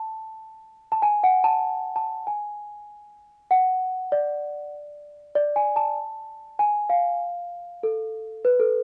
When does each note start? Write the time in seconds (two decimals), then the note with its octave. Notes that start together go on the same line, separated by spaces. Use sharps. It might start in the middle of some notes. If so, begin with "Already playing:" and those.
Already playing: A5
0.92 A5
1.02 G#5
1.23 F#5
1.44 A5
1.96 A5
2.27 G#5
3.51 F#5
4.12 D5
5.35 D5
5.56 G#5
5.76 A5
6.59 G#5
6.89 F5
7.83 A4
8.45 B4
8.60 A4